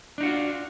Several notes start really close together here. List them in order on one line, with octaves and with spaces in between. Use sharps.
D4 D#4 F#4 F4